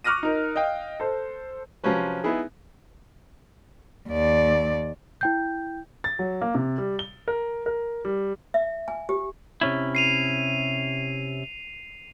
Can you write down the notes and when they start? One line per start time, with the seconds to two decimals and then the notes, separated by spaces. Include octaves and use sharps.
0.04 C#6 D6 F6 F#6 A#6 D#7
0.23 D#4 A#4
0.56 D#5 F5 G5
1.00 A4 C5
1.84 C3 F3 F#3 C4 C#4 B4
2.24 B3 D#4 E4 G#4
4.09 D#2 D5
5.21 E4 G5 G6
6.04 A6
6.19 F#3
6.42 A#3
6.55 C3
6.78 G3
6.99 G7
7.28 A#4
7.66 A#4
8.05 G3
8.54 E5
8.88 G#5
9.09 G4
9.61 C3 C#4 E4
9.95 C7 D#7 F7